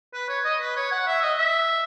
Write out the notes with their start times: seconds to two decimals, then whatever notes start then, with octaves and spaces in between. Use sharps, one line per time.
0.14 B4
0.29 C#5
0.44 D#5
0.61 B4
0.76 C#5
0.91 F#5
1.07 E5
1.22 D#5
1.38 E5